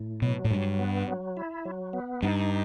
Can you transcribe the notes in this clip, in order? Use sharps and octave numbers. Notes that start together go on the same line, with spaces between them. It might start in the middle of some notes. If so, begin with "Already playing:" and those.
Already playing: A2
B2 F#3
A2
G2 F#3
B3
F#3
E4
F#3
B3
G2 D#4